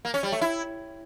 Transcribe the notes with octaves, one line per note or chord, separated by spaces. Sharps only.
A#3
C#4
G3
A3
E4